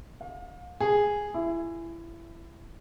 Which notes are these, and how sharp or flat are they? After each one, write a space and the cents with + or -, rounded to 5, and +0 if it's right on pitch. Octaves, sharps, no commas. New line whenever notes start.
F5 +35
G#4 -5
E4 +25